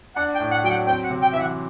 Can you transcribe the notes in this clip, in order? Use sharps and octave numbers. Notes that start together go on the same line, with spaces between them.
D4 F#5
G5
A2
F#5
F#3 G5
F#5
C4 G5
F#5
C3
G5
E3 E5
F#5